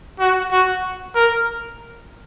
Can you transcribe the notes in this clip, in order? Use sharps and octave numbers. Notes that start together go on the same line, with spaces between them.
F#4
F#4
A#4